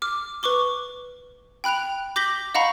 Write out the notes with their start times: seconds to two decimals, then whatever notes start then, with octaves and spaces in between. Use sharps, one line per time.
0.02 D6 F6
0.43 B4 C#6 D6 G7
1.64 G5 B5 F#6 D7 F7
2.16 D6 G6 A#6 B6 F#7 G7
2.54 D#5 F5 F#5 A#5 B5 C#6